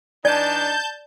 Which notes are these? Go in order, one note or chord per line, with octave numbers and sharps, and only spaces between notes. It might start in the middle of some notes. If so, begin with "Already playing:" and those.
E3 D4 D#4 D5 A5 G6